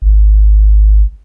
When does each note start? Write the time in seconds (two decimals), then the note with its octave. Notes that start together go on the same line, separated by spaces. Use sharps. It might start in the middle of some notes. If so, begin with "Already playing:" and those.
0.02 G#1